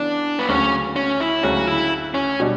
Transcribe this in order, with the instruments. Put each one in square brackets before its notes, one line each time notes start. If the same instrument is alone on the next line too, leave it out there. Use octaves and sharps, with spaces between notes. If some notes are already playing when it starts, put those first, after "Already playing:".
Already playing: [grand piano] C#3 E3 B3 [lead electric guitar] D4
[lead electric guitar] B3
[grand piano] D2 C#3 F#3 [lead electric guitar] C#4
[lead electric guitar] C#4
E4
[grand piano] D2 C#3 F#3 [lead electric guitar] F#4
[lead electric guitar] E4
C#4
[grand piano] B2 G3 D4